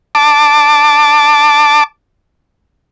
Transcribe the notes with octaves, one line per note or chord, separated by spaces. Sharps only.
A5 D6